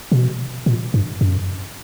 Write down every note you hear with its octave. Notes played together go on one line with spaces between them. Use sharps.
B2
A#2
G2
F#2